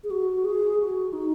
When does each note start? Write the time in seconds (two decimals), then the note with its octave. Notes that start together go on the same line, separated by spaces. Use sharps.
0.04 G#4
0.11 F#4
0.45 G#4
0.80 F#4
1.13 D#4